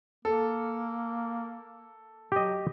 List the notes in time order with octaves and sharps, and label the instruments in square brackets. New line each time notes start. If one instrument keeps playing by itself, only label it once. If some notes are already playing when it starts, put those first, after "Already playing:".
[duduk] A#3 [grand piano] A4
[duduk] F#3 [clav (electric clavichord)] G4 D#5